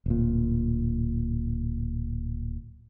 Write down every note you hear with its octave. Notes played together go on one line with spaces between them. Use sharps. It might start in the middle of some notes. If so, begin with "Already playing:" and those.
D1 A#2